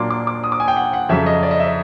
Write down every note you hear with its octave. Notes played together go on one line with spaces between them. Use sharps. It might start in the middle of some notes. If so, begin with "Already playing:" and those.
Already playing: A#2 F#3 A#3 D4 C6 D6
D6
D6
D#6
D6
G#5
G5
F#5
F#5
F2 C#3 F#3 E5
D#5
D5
D#5
E5